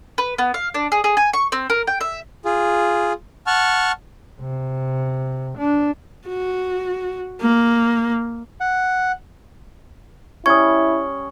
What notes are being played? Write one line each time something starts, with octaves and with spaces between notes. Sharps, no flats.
B4
B3
F5
D4
G#4
G#4
G#5
C#6
C4
A#4
G5
E5
F4 G#4
F#5 A5 C#6 F6
C3
D4
F#4
A#3
F#5
G3 C#4 E4 C#6 D#6 G#6